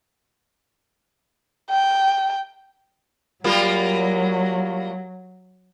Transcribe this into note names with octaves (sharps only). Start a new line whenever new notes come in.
G5
F#3 G3 A#3 F4